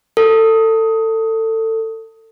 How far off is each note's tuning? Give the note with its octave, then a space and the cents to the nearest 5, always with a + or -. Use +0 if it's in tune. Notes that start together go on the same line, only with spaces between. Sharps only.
A4 +25